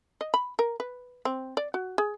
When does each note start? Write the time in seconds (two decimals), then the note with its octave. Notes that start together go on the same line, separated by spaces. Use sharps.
0.21 D#5
0.34 B5
0.59 A#4
0.80 B4
1.25 C4
1.57 D5
1.74 F#4
1.98 G#4